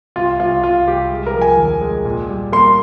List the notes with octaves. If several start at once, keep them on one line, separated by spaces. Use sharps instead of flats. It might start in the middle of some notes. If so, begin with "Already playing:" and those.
C2 F4
C2 F4
C2 F4
C2 G4
G#3
A#4
F3
G#5
D#2
G#3
A#2
G3
A#3 C6